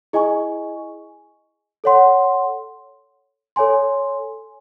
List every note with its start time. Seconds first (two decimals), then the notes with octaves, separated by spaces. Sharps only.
0.13 E4 G#4 D#5 G#5 C#6
1.84 A4 C#5 F#5 C6
3.56 A4 C#5 G#5 C6